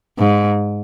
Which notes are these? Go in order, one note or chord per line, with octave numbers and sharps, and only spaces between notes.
G#2